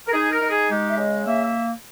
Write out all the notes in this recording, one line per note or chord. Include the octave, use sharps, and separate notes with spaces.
A#4
D#4 G#4
A#4
D#4
G#4
G#3 G4
E5
C#3 D#5
A#3 E5
E5